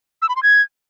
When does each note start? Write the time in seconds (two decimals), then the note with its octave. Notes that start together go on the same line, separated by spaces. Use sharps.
0.22 E6
0.29 B5
0.36 C6
0.43 G#6